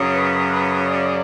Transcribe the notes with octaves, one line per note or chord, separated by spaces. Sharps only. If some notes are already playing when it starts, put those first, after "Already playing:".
Already playing: F#2 C#3 F#3
B4
B4
D5